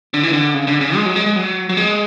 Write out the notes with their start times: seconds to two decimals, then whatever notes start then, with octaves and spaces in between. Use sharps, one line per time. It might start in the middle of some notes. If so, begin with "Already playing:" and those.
0.14 D3
0.23 E3
0.33 D3
0.54 C#3
0.67 D3
0.81 C#3
0.95 G#3
1.06 F#3
1.16 G#3
1.26 G#3
1.36 F#3
1.69 F#3
1.77 G#3